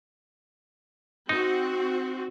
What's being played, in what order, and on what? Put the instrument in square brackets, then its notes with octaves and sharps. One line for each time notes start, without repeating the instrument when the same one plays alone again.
[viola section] C4 F#4 [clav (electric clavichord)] D#4